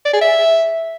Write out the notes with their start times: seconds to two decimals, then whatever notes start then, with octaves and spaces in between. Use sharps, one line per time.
0.06 D5
0.13 G#4
0.21 E5